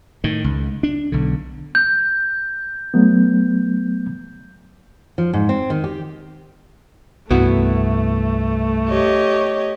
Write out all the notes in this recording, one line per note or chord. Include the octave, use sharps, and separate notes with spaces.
A2 D#3
C#2
D4
B1 D3
G6
F#3 A3 B3
F3
G#2
C4
D#3
G4
C2 G2 A3 B3 E4 F#4
G4 C#5 D#5